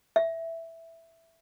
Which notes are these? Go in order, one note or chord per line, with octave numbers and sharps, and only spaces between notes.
E5